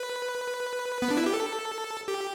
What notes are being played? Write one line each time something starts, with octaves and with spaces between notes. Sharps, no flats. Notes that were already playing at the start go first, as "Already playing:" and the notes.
Already playing: B4
B3
D4
E4
G4
A4
G4